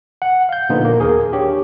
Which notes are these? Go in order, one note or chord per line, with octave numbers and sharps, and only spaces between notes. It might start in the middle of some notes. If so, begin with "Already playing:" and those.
F#5
F5 G6
A#2 D3 F3 B3 D#4 F4
A#3
D#2 G#4 A#4
D4 G4 C#5